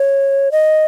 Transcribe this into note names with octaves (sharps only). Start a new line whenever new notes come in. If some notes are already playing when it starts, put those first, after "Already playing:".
Already playing: C#5
D#5